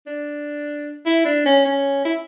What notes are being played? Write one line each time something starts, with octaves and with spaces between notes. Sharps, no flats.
D4
E4
D4
C#4
C#4
E4